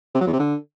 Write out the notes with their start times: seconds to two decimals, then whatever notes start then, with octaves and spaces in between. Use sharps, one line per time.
0.15 C3
0.21 F#3
0.27 E2
0.33 C3
0.39 D3